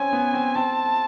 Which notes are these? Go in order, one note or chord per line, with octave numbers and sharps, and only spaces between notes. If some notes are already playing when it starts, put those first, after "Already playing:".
Already playing: C4 C#4 G#5
B3
C4
C4 A5